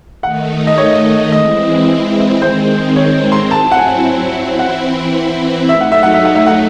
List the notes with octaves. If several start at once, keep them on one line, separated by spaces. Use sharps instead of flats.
D#3 A3 D#4 F#5
D#5
C#5
E3 G#3 C4 E4 D#5
D#3 G#3 C4 C5
C#5
C6
F#3 C4 E4 A5
F#5
G#5
E3 C4 E4 F#5
F#3 A3 D#4 E5
F#5
E5
F#5
E5
F#5
E5
F#5